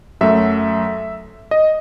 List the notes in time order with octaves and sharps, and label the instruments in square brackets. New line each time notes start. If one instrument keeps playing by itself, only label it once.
[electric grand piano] F#2 F#3 A3 E5
D#5